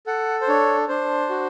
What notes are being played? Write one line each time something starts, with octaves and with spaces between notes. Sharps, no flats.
A4 F#5
C5
D4 C#5
D4 C5
F#4